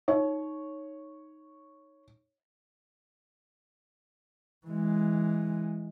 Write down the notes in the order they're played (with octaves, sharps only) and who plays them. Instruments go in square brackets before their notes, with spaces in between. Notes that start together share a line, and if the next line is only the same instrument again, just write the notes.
[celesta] D#4 [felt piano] C#5
[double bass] E3 G#3